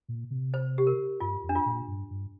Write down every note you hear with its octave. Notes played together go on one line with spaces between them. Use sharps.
A#2
C3
C5
G4
A#4
G2 F4
F2
D4
F4
A#2
G2
G2